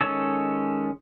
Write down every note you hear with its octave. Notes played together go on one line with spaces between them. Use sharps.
D#3 G#3 C#4 A4 C#5